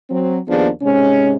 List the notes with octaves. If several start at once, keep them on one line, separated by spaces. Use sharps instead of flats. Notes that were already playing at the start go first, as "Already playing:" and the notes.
F#3 C4
D#2 F3 B3 D4 G#4
G#2 C3 G#3 C#4